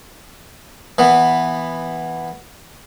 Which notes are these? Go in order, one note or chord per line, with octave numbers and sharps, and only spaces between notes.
E3 B3